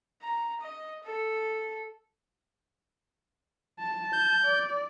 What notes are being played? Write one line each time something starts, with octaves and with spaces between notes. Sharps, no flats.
A#5
D#5
A4
A5
G6
D5